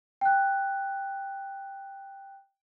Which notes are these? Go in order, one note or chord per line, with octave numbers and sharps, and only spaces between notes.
G5 F#6